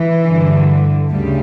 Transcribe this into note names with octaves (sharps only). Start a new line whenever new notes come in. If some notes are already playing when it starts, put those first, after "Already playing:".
Already playing: E3
G2 D3
D2 C#3 G3